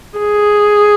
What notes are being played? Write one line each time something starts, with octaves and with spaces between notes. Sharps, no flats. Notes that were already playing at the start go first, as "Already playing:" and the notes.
G#4